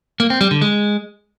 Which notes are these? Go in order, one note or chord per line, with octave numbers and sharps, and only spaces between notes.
A#3
C4
G3
D3
G#3